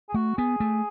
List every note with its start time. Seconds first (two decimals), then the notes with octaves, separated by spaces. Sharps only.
0.09 G#4
0.14 A3 F#4
0.37 B3 G#4
0.60 A3